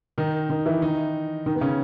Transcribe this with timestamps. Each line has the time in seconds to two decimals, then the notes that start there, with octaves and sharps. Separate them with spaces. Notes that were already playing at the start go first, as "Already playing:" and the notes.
0.18 D#3 D#4
0.49 D#3 D#4
0.66 E3 E4
0.82 D#3 D#4
1.46 D#3 D#4
1.55 B3
1.61 C#3 C#4